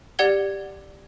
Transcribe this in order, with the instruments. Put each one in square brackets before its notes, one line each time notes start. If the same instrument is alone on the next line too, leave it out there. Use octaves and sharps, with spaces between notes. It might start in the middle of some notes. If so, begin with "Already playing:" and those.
[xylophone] G4 D5 F#5 G#6 G7